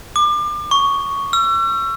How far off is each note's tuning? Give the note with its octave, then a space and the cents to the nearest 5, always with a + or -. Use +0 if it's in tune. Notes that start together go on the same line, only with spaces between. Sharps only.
D6 +30
C#6 +10
E6 +40